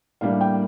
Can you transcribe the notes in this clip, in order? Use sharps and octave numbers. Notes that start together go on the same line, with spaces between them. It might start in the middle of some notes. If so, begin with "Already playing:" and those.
A2 G3 A#3 D4 F5
G5